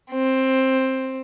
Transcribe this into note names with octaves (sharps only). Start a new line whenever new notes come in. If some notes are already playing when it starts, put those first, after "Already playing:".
C4